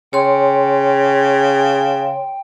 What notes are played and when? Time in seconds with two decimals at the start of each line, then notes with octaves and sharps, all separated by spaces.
0.13 C#3 C#5 G5 C6